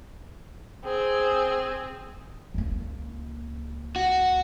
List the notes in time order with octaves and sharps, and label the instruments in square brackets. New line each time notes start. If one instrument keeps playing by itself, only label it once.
[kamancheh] C4 G#4
[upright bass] C#2 A#3
[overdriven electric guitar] F#4